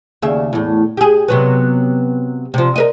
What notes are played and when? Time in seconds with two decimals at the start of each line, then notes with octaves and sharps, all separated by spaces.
0.22 D#2 C#3 E5
0.53 E2 A2
0.97 G4 G#4
1.28 C3 F#3 B3
2.54 C3 F3
2.76 A#4 B4 D#5